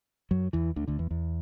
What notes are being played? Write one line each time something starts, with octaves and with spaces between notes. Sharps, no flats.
F#2 F#3
E2 E3
D2 D3
D2 D3
E2
E2